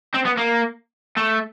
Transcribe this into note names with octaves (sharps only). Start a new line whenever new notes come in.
C4
B3
A#3
A3